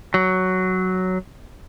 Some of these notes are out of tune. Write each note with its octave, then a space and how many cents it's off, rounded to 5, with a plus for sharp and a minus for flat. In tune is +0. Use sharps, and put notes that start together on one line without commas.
F#3 +5